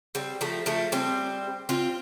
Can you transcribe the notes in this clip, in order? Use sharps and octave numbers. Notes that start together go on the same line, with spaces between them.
G3 C4
F3 A3
F3 A3
G3 C4
C4 F4